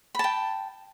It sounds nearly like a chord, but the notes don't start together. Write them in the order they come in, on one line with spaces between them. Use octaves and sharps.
B5 A5 G5